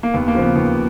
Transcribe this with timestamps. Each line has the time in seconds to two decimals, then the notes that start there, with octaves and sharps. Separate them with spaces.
0.03 A#3
0.14 D#2 B3
0.28 A#3
0.35 C#3 F3
0.42 B3
0.56 D#2 B3